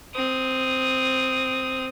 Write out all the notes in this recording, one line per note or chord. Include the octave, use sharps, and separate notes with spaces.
C4 D#6